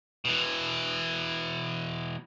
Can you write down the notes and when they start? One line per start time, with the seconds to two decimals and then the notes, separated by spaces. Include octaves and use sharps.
0.25 B2 E3